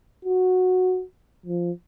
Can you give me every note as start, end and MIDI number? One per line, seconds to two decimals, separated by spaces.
0.25 1.03 66
1.46 1.71 53